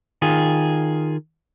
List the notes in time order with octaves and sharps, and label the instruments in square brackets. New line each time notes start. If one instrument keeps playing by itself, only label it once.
[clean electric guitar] D#3 F4 G#4